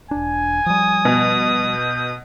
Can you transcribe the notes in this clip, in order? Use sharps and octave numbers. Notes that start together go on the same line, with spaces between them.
E1 D4 G#5
F3 G3 D#6
B2
G6